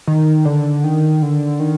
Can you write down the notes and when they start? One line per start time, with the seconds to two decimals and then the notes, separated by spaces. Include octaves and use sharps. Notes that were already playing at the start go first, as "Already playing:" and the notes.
0.07 D#3
0.45 D3
0.84 D#3
1.22 D3
1.60 D#3